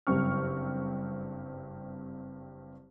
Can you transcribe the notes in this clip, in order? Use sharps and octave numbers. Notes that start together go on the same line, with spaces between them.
F#1 G2 C4 C#6 F6